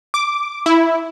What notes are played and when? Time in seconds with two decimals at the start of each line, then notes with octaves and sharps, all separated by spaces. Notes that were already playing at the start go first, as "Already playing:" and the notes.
0.14 D6
0.66 E4